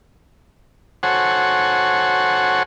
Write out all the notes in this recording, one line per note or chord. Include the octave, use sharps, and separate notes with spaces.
F#4 A4 C5 C#5 F#5 G#5